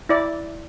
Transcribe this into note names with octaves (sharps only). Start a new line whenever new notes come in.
E4 D5